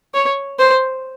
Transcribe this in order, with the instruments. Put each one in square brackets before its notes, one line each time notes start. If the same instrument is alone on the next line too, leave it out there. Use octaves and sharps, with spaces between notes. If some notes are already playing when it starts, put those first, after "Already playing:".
[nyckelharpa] C#5
C5